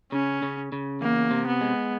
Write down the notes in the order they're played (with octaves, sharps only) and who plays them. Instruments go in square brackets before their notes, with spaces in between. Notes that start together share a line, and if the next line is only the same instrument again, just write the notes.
[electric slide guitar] C#3 [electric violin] C#4
[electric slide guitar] C#3
C#3
[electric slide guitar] E2 [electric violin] A#3
[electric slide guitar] C3
[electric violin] B3
[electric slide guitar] G#3